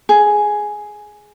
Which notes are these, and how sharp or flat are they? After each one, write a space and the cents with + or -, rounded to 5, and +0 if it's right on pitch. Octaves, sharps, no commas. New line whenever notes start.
G#4 +5